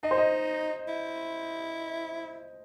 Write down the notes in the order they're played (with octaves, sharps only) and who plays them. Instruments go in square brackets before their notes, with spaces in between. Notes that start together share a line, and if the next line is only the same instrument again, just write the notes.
[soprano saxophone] D#4 [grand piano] D#5
[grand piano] C5
D#5
[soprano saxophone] E4